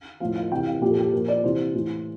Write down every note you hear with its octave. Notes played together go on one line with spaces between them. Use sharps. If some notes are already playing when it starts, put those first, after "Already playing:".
A2 F3 F5
F5
C3 E3 G5
F5
A#2 F3 G4
A4
G4
A#2 F3 A#4
D5
C3 E3 C5
A2 E3